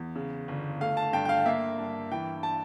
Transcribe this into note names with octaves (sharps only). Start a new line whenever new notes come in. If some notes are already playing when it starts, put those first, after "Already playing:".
Already playing: E2
C#3
G1
A3 F5
A5
G2 G5
G5
F5
A#3 E5
G2
E3 G5
A5